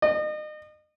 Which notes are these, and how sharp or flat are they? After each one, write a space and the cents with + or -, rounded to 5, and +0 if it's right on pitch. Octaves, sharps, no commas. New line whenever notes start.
D#5 -35